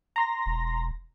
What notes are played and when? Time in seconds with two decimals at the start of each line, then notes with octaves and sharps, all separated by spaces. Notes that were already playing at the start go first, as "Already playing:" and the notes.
0.16 A#5 C6 A#6
0.46 E1